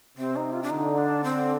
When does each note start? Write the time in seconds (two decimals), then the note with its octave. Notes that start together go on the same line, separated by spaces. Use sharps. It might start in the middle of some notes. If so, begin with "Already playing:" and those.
0.18 C3 C4
0.36 D#4
0.53 F4
0.63 D4
0.70 D3 D#4
0.97 D4
1.24 C4